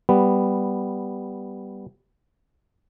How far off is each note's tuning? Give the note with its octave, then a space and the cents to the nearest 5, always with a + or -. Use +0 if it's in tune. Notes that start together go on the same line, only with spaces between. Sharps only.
G3 +0 B3 +0